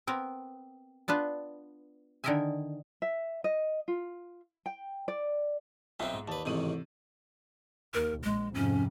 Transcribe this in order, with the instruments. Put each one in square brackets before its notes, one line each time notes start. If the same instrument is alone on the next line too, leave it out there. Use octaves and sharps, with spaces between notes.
[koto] B3 C4 A#4
B3 D4 F4 B4
D3 D#3 A#4 D#5 E5 G#5
[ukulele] E5
D#5
F4
G5
D5
[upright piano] B1 E5 G5 [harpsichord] C4 D#4
[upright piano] G#2
[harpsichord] D#2 B4 [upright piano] D5 A5
[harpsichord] A1 G#2 D#3 [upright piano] C3 D#7 F#7
[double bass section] D#2 [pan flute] A#4
[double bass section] A#1 [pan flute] G#3
[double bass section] F2 G#2 C3 [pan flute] C#4